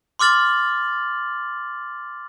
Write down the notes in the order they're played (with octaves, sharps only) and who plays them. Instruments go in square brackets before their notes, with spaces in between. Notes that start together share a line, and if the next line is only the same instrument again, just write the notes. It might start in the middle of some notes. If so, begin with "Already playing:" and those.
[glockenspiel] C6 D6 F6 A6 F#7